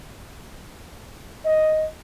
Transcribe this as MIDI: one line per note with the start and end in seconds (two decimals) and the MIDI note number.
1.45 1.83 75